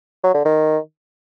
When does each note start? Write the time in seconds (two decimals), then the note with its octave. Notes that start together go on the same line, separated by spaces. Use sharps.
0.24 F#3
0.34 D3
0.45 D#3